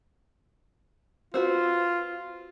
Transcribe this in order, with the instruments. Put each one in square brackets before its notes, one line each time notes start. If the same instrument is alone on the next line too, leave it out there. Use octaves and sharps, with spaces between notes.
[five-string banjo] C4 F#4 B4 [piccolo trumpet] F4